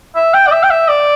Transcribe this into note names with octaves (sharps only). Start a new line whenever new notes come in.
E5
G5
D5
E5
G5
E5
D5